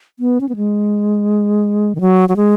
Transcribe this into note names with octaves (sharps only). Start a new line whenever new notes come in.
B3
C#4
B3
G#3
D#3
F#3
F#3
G#3